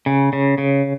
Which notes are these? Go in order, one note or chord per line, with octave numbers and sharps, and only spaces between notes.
C#3
C#3
C#3